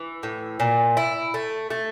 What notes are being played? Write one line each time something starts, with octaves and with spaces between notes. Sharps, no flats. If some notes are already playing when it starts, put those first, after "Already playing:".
Already playing: E3
A2
A#2
E4
A3
A3